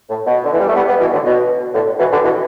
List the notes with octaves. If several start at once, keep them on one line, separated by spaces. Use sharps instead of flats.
A2
B2
D3
E3
G3
A3
G3 B3
G3 B3
B2 E3
A2 D3
B2
A2 D3
B2 E3
D3 G3
B2 E3